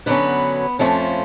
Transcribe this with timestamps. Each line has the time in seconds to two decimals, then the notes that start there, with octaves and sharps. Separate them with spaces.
0.06 D3 F#3 B3 C#4 B4
0.79 F2 F3 A3 C#4